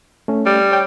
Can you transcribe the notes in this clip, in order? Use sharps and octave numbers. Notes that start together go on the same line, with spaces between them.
A3 C#4
G3
C#5 G5